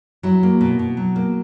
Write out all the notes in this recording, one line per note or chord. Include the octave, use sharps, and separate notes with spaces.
F#3 E4
A#3
B2
B2
F#3
A#3